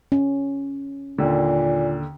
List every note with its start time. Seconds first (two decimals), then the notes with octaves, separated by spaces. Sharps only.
0.12 C#4
1.18 D#2 A#2 D3